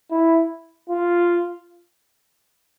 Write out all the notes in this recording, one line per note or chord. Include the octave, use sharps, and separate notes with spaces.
E4
F4